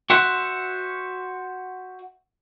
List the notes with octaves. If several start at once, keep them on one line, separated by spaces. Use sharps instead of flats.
F#4 C5 E5 F#5